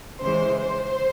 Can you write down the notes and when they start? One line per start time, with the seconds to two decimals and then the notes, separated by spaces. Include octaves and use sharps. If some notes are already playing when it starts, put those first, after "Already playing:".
0.22 C#3 E3 G#3 C5
0.59 C5